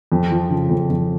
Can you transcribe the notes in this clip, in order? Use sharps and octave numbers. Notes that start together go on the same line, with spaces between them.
F2
F3
C#3
F2
F2